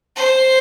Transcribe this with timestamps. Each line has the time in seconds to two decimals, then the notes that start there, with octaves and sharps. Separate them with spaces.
0.16 C5